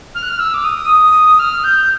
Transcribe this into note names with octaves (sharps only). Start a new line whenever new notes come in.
F6
F#6
F6
E6
D6
D#6
F6
G6